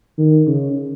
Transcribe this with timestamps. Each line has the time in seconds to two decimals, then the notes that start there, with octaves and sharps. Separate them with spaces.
0.18 D#3
0.47 C#3